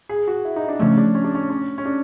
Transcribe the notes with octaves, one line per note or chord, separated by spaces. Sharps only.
G#4
F#4
E4
D#4
D4
C#3 F3 A3 C#4
D4
C#4
D4
C#4
C#4
C#4
D4